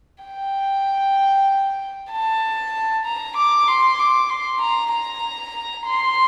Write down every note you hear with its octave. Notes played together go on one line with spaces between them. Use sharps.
G5
A5
A#5
D6
C6
D6
C6
A#5
A#5
C6